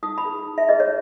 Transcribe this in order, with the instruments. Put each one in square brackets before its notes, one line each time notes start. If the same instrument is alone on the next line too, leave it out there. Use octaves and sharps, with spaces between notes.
[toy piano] D#4 D#6
B5
G#4 B4
D#4
E5
G#4 B4 D#5
C#5